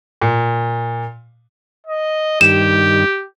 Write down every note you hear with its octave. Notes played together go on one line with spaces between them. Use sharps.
A#2
D#5
G2 D#3 G4 E7